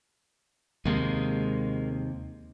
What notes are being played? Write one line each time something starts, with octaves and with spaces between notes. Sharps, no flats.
D#2 C3 G#3 A#3